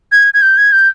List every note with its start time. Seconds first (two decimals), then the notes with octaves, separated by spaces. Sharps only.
0.12 G#6
0.34 G#6
0.42 G6
0.57 G#6
0.72 G6